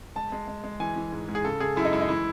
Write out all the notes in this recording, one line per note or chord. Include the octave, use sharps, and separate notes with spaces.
G#3 A5
G#3
G#3
G#3
E3 G#5
E3
G#2
G#2
G#4
C#3 A4
C#3 G#4
F#2 E4
D#4
G#3 E4
D#4
E3 E4